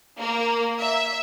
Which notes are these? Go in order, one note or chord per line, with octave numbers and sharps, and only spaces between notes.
A#3
E5